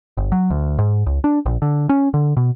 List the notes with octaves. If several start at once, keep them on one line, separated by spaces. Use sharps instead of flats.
G1
F#3
D2
G#2
C#2
D4
A#1
D3
C#4
D3
B2